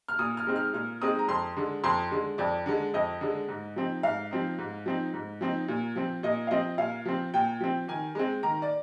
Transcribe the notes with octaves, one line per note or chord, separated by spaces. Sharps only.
F6
A#2 D#6
F6
G#3 C4 D#4
F6
A#2 F6
G#3 C4 D#4 D#6
A#5
F2 C6
D3 G#3
F2 C6
D3 G#3
F2 D5
D3 G#3
F2 D#5
D3 G#3
G#2
F3 C4 D#4
G#2 F5
F3 C4 D#4
G#2
F3 C4 D#4
G#2
F3 C4 D#4
A#2
F3 C4
A#2 D#5
F5
F3 C4 D#5
A#2 F5
F3 C4
A#2 G5
F3 C4
D#3 G#5
G#3 C4
D#3 A#5
D5